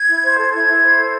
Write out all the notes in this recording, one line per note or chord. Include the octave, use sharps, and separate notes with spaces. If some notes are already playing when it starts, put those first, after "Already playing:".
Already playing: G#6
E4
C5
A4
E4 G#6
E4
C5
A4